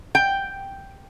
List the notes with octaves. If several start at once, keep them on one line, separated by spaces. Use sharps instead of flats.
G5